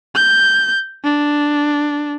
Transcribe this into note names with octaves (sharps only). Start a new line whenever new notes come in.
G6
D4